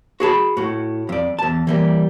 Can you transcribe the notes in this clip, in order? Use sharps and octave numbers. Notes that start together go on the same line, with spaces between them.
F#4 G#4 A5 B5
A2 F#4
F2 D5
E2 A5
E3 G3 A#3